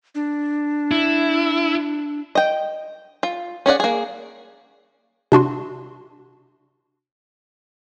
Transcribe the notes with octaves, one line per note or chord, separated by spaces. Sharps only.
D4
E4
D#5 G5
F4
C#4 G#4 D5 F#5
A#3 G#4
C3 D4 F#4 C6